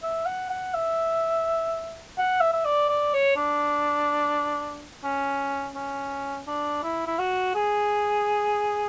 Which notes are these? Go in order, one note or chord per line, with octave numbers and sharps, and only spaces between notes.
E5
F#5
F#5
E5
F#5
E5
E5
D5
D5
C#5
D4
C#4
C#4
D4
E4
E4
F#4
G#4